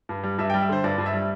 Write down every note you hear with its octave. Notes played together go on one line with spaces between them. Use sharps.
G2
G3
G2 E5
G3 G5
E5
D3 C5
G2 D5
G2
E5
G3